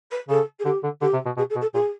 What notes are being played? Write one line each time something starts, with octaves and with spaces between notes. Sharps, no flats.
B4
C#3 A4
G#4
D3 G4
D3
D3 G4
C3
B2
B2 G#4
A4
B2
A4
A#2 G#4